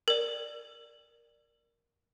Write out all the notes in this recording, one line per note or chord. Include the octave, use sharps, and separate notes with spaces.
A#4 D5